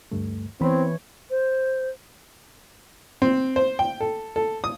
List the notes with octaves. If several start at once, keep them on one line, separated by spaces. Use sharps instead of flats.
D2 G2 A3
E3 B3 C4 C#5 B5
C5
C4
C5
G5
A4
A4
D#6